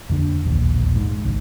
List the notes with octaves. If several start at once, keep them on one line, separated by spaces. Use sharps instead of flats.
F2 D3 D4
E1 A#1 D#2
G#2
G#1 C#2